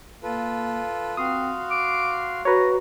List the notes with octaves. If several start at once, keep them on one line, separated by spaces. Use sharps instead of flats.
A#3 F4 A4 B4
C4 F#4 F5 C6 D#6
D6
F#4 B4 C#5 A#5